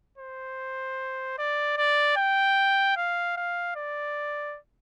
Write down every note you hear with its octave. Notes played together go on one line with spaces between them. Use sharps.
C5
D5
D5
G5
F5
F5
D5